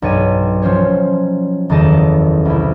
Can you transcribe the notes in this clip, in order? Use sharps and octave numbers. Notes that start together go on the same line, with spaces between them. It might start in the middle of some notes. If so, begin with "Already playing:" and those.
B1 G2 C#5 A6 D#7
F3 C#4 C5 C#5
F#1 E2 D#3 A4 D#5 A5
C2 E4